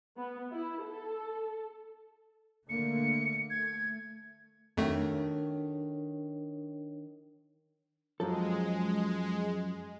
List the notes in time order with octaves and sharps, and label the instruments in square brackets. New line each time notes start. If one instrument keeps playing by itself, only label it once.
[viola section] B3
E4
A4
[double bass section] D3 A3 A#3 [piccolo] C#7
[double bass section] A3 [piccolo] G#6
[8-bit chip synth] F2 A3 [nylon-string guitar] D#3 F#4 A4 [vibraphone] D4 A#4 C#5
[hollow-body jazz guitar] F#2 F3 A4 [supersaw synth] G#3